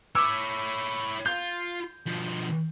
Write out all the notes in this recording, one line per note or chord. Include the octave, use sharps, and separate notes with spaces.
E4 C#5 D6 E6
F4 G6
B2 F3